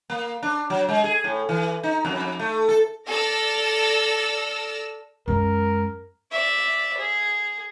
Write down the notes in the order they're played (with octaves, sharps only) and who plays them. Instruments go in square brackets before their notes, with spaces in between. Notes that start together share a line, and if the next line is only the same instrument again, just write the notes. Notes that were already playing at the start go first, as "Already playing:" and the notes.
[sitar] A#3
D4
F#3
G#3
G#4
A2
E3
D#4
F2
A3
A4
[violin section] A4 D5 E6 F6 A6 A#6
[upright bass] F#2 G#3 [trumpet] A#4
[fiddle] D5 E5
G#4